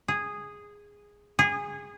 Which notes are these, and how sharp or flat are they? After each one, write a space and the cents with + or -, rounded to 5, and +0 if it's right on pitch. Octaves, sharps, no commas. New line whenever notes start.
G#4 -10
G#4 -20